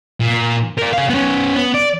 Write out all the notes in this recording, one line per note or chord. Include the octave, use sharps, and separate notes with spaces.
A#2
A#4 D5
G#4 F5
B3 C#4
B3
D5